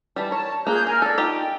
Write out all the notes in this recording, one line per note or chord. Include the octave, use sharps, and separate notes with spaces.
E3 G3 A5
A#4 C#5 A5
A#3 F4 G#4 F#6 G6
A#4 F5 G#5 F6
D4 A4 D5
D#4 F4 G4 G5